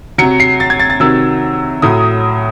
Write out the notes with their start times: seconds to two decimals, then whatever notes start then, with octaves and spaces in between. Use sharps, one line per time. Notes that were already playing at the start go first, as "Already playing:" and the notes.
0.18 C3 F#3 C#7
0.40 C7
0.60 A6
0.70 G#6
0.80 A6
0.90 A6
1.00 C3 D#3 F#3 E6
1.82 A2 F#3 D#6